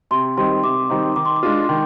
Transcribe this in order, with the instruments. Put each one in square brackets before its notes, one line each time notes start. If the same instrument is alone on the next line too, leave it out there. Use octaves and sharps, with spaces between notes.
[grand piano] C3 [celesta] C6
[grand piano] D#3 G3 C4 D#4 [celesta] C6
[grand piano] C3 [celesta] D6
[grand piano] D#3 G3 C4 D#4
[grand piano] D#3 [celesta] D6
[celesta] C6
D6
[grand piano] G#3 D4 F4
[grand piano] D#3 [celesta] C6